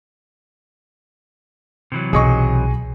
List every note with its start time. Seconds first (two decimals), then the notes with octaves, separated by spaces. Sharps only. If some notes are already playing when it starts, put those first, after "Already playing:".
1.92 C3 E3 F#3
2.13 B1 G#4 D#5 C#6